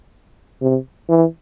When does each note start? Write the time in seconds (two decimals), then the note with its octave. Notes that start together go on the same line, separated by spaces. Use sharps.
0.62 C3
1.10 E3